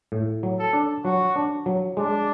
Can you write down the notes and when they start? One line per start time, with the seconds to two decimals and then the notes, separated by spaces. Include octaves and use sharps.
0.12 A2
0.43 F#3
0.59 A4
0.73 D4
1.05 F#3 F#4
1.36 D4
1.66 F#3
1.97 G#3 D4